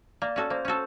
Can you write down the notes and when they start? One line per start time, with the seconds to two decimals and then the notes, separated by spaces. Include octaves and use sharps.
0.22 A#3 D5
0.36 C#4 F#4 A4
0.50 A#3 C5
0.65 C#4 F#4 A4